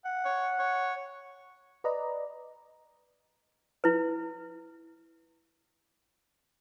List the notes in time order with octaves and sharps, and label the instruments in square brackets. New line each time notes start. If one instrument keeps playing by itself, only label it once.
[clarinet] F#5
[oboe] C#5
C#5
[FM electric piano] B4 D5 D#5 A#5
[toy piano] E4 B4